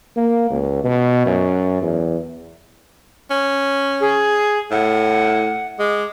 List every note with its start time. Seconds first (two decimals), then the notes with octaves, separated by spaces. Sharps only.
0.16 A#3
0.50 C#2
0.84 B2
1.26 F#2
1.82 E2
3.31 C#4
4.00 G#4
4.71 A2 F#5
5.79 G#3 D6